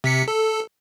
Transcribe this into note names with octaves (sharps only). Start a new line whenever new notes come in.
C3 B6 C#7
A4